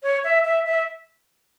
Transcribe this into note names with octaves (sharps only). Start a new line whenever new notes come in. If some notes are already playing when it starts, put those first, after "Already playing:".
C#5
E5
E5
E5